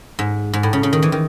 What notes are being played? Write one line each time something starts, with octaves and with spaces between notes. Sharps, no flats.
G#2
G#2
A2
C#3
C#3
D#3
E3
D#3